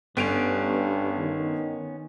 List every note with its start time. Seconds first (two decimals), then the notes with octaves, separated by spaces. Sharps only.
0.17 G1 G2 B3 C#4 D7 F7
1.18 D#3